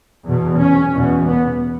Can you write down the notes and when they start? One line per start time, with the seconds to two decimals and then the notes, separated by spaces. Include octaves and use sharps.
0.25 E2 B2
0.58 C#4
0.94 E2 B2
1.27 B3